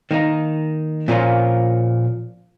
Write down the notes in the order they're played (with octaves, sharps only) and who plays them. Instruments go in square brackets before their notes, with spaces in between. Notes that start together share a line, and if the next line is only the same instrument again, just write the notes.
[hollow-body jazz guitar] D#3 A#3 D#4
A#2 F3 A#3 C#4 F4